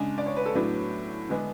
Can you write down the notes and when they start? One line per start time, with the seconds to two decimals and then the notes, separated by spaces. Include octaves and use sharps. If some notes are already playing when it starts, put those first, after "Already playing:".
Already playing: C#3 G#3 D4
0.18 D5
0.26 C#5
0.36 B4
0.46 A4
0.55 A2 F#3 B3 D4
1.29 D3 G#3 B3 D4